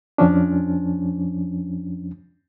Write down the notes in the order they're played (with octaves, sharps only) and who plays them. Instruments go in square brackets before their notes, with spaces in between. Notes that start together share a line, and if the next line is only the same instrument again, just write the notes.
[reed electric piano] F2 F3 C#4 D4